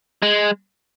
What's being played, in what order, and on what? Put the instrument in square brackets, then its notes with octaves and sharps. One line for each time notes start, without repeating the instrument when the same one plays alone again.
[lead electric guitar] G#3